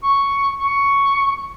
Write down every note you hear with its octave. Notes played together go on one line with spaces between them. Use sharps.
C#6
C#6